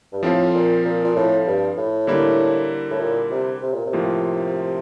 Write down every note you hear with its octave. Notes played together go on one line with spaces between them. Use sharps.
G2
A2 F3 C4 F4
A#2
A#2
A#2
A2
G2
A2
D3 G3 A#3 E4
A2
A#2
C3
C3
A#2
C3
A2 F3 A#3 F4